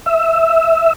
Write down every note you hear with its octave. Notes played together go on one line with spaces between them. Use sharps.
E5